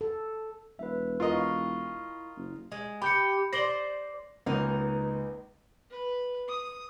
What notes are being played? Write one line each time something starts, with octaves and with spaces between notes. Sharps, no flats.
A4
E1 B4 E5
F4 A#4 D#5
E4 F5 C#6
F#1
G#3
G4 B5 G6 C#7
C5 D5 A#6 F#7 G7
C#2 C#3 A#3 B3 D#4 A#4
B4
D#6